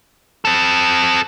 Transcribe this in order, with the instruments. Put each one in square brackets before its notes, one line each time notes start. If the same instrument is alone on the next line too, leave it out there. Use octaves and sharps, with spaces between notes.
[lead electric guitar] C4 A4